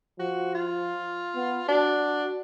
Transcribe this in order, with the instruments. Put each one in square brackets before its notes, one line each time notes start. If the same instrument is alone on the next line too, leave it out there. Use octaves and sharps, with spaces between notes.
[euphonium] F3 [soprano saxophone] F#4
[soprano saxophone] F4
[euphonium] B3
[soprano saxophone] D4 [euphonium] F#4